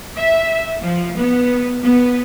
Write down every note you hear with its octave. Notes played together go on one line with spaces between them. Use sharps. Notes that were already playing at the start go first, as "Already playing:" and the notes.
E5
F3
B3
B3